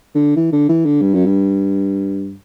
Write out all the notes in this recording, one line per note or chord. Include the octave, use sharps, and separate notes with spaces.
D3
E3
D3
E3
D3
G2
F#2
G2